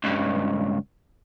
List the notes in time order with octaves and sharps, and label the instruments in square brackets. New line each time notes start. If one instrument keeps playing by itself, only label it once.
[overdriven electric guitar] C#2 G2